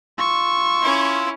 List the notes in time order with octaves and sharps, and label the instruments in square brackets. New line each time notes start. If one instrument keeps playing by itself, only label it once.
[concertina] F4 E6 [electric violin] C#6
[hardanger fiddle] C#4 E4